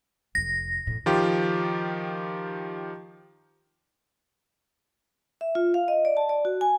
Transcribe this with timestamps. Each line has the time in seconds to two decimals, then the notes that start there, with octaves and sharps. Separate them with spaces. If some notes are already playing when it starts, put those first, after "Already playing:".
0.35 F1 F2 A#6
0.87 A2 E3
1.06 D#3 F3 F4 G4
5.41 E5
5.55 F4
5.74 F5
5.88 D#5
6.05 D5
6.17 A5
6.29 D5
6.45 F#4
6.61 G#5